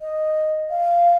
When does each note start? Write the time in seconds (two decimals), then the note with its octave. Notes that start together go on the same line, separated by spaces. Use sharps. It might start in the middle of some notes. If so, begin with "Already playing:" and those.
0.01 D#5
0.70 F5